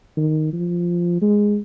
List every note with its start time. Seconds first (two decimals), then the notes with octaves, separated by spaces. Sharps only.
0.17 D#3
0.53 F3
1.22 G#3